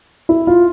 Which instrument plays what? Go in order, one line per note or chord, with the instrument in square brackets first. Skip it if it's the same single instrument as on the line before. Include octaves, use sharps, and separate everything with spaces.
[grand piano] E4
F4